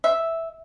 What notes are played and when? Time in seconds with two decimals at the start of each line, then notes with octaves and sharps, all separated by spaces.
0.04 E5